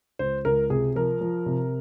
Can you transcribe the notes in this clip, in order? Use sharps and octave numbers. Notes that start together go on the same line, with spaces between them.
C#2 C5
C#2 A#4
C3 G#4
F3 A#4
F3
C3